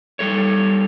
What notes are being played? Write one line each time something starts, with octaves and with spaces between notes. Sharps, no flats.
G3 A4 C#5